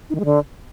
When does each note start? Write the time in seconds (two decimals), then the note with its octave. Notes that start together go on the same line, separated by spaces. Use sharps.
0.10 D#4
0.15 D#3
0.20 G#3
0.25 D3